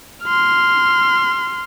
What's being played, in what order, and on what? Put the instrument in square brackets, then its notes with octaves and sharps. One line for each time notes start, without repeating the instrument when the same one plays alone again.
[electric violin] C6 F6